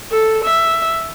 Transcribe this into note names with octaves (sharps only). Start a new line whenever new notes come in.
A4
E5